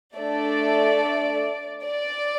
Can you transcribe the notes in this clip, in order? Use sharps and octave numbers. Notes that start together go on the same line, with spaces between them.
A3 D4 A4 D5
D5